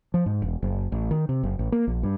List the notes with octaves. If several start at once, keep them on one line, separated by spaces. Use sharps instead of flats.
F3
G#2
E1
F#1
A1
D#3
C3
F#1
A1
A#3
A#1
G2